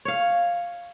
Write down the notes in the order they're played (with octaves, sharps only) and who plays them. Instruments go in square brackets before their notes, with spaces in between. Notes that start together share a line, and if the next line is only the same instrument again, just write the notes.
[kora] C#5 F5